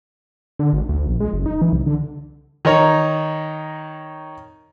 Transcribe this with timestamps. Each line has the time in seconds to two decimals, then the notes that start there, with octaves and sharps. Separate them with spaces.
0.59 D3
0.73 G#1
0.89 D2
1.07 A#1
1.20 G#3
1.33 F#1
1.46 D#4
1.62 E3
1.73 C2
1.86 D3
2.65 D#3 D#4 C#5 A#5